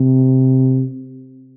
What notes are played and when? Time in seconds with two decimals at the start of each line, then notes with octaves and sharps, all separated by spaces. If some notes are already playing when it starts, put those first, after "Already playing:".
Already playing: C3